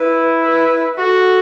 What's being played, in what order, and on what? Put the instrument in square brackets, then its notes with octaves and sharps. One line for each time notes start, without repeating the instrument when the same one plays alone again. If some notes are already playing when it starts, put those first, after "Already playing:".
Already playing: [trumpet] E4 [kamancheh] B4
[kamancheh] B4
[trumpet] F#4 [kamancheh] A4